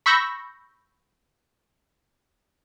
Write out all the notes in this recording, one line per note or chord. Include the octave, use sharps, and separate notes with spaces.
B5 C#6 E6 G6 A#6